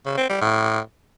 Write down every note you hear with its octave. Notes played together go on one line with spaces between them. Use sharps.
C#3
C4
G3
A2